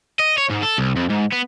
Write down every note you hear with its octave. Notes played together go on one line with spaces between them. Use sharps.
D#5
C#5
G#2
A4
C2
F2
G#2
B3